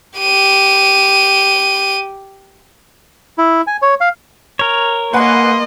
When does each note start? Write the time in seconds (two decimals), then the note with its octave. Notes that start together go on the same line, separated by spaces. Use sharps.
0.18 G4 D#7
3.38 E4
3.67 G#5
3.82 C#5
4.01 F5
4.59 A#4 C#5
5.13 A#3 B4 D#5 F#5 G#5 C6